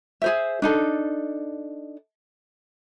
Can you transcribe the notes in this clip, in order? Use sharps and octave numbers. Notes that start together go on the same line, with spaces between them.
G#4 C5 E5
D4 D#4 A4